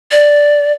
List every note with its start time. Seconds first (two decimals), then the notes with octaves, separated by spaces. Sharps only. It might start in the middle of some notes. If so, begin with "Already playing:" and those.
0.12 D5